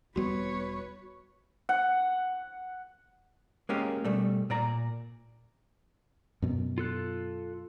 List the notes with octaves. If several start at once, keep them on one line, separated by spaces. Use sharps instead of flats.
E1 G3 B3 F#4 B4 C#5
F#5
G#3 A#3 C#4 G4
B2 G3 A3
A#2 D5 A#5
F#2 B2 F#3
F4 A4 F#6